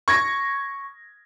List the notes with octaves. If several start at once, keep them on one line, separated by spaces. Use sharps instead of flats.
C#6 G#6 A#6